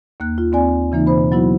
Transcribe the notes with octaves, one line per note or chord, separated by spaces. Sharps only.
D#2 A#3 F#6
F4
D#2 C4 D5 G#5
C#3 E3 A#3 D#4
B2 C5 B5
F#3 B3 E4 F#4